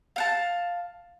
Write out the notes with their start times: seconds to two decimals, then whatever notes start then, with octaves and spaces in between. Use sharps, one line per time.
0.16 F5 F#5 A5